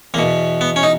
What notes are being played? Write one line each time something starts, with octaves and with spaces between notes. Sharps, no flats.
E2 B2 A#3
B3
C#4
D#4